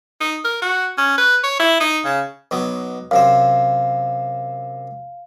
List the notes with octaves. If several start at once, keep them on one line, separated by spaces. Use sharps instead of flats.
D#4
A#4
F#4
C#4
B4
C#5
E4
D#4
C#3
B1 F#3 B3
F#2 C3 C5 F5